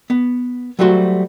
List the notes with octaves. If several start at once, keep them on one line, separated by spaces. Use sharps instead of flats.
B3
F#3 G3 A3 F#4 C5